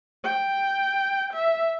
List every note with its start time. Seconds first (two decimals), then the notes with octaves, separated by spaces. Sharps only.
0.24 G5
1.34 E5